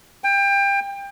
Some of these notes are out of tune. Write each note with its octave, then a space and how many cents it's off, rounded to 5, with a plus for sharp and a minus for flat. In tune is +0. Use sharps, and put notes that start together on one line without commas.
G5 +25